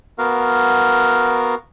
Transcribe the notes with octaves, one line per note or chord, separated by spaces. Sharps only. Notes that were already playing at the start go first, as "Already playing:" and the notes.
B3 F#4 A#4 F5